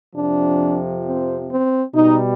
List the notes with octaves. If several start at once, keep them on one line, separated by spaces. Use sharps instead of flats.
F2 C3 F3 D4
C4
C4
B2 G3 D#4